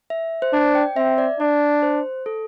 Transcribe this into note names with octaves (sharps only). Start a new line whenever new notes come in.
E5
C5
D4 D5
G5
C4 E5
D5
D4 D5
C5
A4